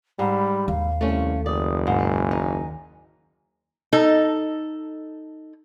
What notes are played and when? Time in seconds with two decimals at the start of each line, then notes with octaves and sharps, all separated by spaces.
0.19 G#2 G3 B5
0.68 D#2 F5
1.01 C2 A3 C#4
1.46 F#1 D5 D#6
1.87 G#2 G#5
2.31 D#4
3.93 D#4 A4